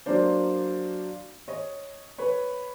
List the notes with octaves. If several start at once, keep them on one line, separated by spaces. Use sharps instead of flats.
F#3 A#3 D4 C5 D5
C#5 D#5
B4 C#5